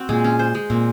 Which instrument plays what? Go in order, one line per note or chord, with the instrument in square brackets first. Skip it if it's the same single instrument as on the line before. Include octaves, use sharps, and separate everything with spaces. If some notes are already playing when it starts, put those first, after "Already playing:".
Already playing: [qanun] C4 F#4
[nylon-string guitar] A#2 [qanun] G#3
[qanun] C#4
C5
G#3
[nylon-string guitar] A#2 [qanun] C4